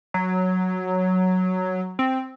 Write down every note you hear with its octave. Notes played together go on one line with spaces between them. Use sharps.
F#3
C4